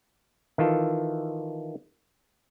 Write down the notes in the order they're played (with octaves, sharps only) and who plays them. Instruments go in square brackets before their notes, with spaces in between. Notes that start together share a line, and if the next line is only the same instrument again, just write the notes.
[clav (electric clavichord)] D#3 E3 F4 A4